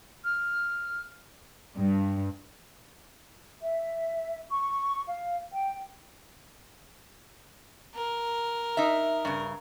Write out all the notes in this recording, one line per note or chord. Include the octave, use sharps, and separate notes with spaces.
F6
G2
E5
C#6
F5
G5
A#4
D#4 E5
G2 C#3